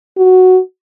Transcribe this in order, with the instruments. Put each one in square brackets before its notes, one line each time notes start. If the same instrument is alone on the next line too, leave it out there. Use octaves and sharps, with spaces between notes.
[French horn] F#4